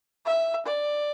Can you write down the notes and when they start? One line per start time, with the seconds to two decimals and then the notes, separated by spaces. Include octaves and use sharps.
0.26 E5
0.66 D5